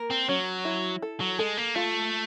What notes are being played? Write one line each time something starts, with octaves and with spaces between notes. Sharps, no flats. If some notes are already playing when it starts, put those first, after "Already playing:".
Already playing: A#3 A#4
C4
F#3 C#4
E4
A4
F#3
G#3 A4
A#3
A3 F4